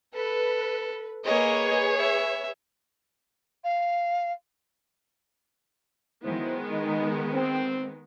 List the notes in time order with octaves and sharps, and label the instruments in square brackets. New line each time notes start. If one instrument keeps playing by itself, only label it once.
[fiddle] A4 [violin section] B4
[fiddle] A#3 D#5 [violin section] G#4 B4 C#5
[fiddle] E5
[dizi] F5
[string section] D#3 G#3 B3 [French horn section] F#3 E4 C5
[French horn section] D#4
C4